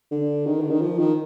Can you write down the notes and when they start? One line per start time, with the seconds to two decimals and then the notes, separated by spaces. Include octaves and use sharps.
0.11 D3
0.46 D#3
0.61 D3
0.70 D#3
0.81 F3
0.99 D#3